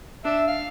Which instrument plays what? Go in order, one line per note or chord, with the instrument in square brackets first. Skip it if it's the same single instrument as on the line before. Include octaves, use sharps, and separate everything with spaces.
[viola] D4 [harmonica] E5
[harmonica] F5